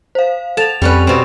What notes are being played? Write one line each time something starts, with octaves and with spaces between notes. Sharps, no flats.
C5 F5
A4 A5 F7
F2 G3 C#4 B4
B2 C4